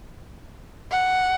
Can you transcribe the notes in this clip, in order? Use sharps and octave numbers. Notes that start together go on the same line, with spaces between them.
F#5